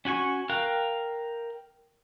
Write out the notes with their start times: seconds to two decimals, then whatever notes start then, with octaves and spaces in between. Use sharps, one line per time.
0.05 C#4 F#4 G#5 C#6
0.50 A#4 F5 G5 F#6